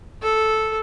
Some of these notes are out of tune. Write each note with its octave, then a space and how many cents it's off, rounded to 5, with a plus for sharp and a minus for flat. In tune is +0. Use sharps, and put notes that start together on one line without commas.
A4 -5